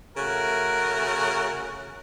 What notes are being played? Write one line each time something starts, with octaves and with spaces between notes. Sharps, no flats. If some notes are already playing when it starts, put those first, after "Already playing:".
C#3 A3 F#4 A#4